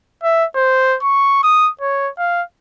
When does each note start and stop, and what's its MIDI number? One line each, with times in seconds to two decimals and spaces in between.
0.24 0.45 76
0.56 0.97 72
1.03 1.41 85
1.43 1.70 87
1.81 2.10 73
2.18 2.43 77